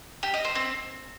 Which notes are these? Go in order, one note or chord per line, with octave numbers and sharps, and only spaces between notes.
G4
D#5
C5
C4